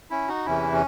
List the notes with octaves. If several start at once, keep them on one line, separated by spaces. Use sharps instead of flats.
C#4 E4
D#4 F#4
E2 C3 E3 C#4 E4
C#4